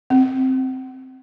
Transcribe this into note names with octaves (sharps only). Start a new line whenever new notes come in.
C4